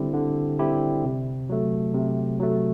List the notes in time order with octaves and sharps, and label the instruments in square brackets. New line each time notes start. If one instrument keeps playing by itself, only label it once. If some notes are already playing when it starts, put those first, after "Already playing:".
Already playing: [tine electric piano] D3 G3 C4 E4 G4
D3
G3 C4 E4 G4
C3
F#3 A3
C3
F#3 A3